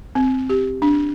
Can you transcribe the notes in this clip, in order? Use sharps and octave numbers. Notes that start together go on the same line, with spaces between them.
C4
G4
D4